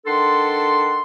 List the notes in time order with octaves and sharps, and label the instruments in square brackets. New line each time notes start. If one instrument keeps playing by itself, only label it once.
[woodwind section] D#3 D4 A4 F#5 C6